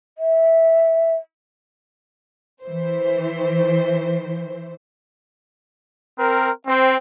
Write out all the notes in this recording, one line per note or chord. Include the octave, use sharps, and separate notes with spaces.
E5
E3 C5
C4 A#4
C4